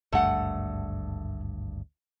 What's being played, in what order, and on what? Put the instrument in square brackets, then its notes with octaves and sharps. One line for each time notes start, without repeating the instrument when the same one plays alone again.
[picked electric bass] G#1 D2 G2 [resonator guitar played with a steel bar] A3 F#5